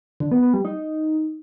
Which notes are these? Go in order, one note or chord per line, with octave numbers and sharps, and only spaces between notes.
D3
B3
B3
G3
D#4